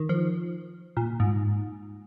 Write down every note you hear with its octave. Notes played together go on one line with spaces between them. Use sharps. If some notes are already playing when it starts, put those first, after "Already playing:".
Already playing: D#3
F3
A#2
G#2